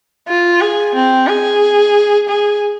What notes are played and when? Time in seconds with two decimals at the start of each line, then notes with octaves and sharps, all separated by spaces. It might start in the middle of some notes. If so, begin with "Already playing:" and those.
0.28 F4
0.61 G#4
0.95 C4
1.28 G#4
2.29 G#4